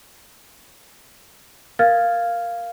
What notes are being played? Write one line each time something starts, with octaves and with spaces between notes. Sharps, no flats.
A#4 F5 F6 G#6 A6